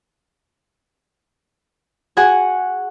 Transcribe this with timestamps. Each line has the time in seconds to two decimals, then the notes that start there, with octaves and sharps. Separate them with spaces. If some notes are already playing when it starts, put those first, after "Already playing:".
2.17 F#4 G#4 F#5 G#5